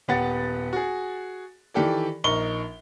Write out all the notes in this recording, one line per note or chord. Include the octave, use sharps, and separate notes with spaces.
D#1 B3 G4 F#5 A6
F#4 G#4
D#3 E3 G4 A4 D5
A#1 D#4 A#4 C#6 G7